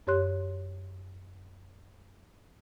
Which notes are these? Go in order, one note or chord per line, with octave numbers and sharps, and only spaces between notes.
F#2 G4 C#5 C6 F#6